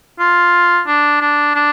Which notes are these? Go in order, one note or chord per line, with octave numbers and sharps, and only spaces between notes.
F4
D4
D4
D4